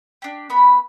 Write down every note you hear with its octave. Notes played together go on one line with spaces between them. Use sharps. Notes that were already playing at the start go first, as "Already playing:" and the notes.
D4 G4
B3 B5